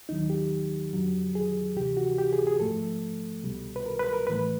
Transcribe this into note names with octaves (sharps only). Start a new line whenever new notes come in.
D#2 D#3 F#3 D#4
G4
F2 D3 F#3
G#4
D2 C3 E3 G4
F#4
G4
G#4
G#4
G#2 F3 A3 A4
C2 B2 G3
B4
A#4
B4
A#4
A2 E3 A3 B4